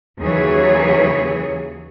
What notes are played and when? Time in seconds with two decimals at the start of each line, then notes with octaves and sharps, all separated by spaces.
0.20 D#2 C#3 E3 F#3 G#4 C#5